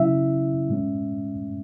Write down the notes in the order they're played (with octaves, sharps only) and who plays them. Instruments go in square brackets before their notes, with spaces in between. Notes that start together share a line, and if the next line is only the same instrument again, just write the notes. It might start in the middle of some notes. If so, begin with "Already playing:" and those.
Already playing: [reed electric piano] C#3 F#3 C#4 E4 E5
A2 G#3 C#4